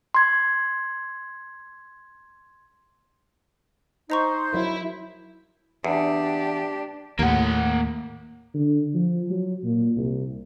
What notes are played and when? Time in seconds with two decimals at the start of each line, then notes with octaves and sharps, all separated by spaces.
0.15 C6 G#6
4.10 D#4 C5 D#5 A#5 C#6
4.53 F#3 E4 A#4
5.84 E2 D4 G4
7.19 D#2 A2 A#3 F#5
8.54 D3
8.94 F3
9.30 F#3
9.64 A#2
9.97 C2